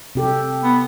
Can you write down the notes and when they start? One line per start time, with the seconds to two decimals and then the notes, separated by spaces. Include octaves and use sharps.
0.15 C3 G4 A4
0.63 B3